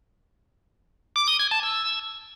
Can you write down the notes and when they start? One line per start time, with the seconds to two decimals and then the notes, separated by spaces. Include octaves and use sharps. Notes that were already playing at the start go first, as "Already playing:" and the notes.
1.16 D6
1.28 D#6
1.39 G#6
1.51 A5
1.63 E6